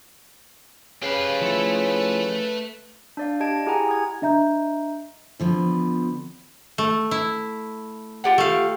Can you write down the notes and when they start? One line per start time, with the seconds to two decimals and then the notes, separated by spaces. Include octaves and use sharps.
1.03 C#3 G4 B4 F5 B5
1.42 F3 A3 E4 A4
3.17 D4 D5 F5
3.40 G4 D#5 A5 G#6 D7
3.66 E4 G4 G#4 F#5 G#5 A#5
3.87 G#5 D#6 G#6
4.22 D4 D#5 E5 A#5 G6
5.40 D3 F3 B3
6.78 A3
7.11 E4
8.24 F4 G4 F#5
8.38 A3 F5